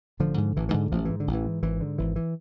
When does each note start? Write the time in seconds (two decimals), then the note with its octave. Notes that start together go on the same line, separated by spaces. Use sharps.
0.20 A1 D3 F3
0.38 G#2
0.56 A1 E3
0.69 E3
0.73 G#2 D3
0.91 A1 F3
1.05 G#2 E3
1.20 D3
1.27 A1
1.34 E3
1.44 G#2
1.62 G#1 E3
1.80 G#2 D3
1.98 G#1 E3
2.16 E3